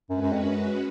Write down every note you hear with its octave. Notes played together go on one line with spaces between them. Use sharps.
F#2 G#3 C#4 F#4 B4
F#2
F2
F#2
F#2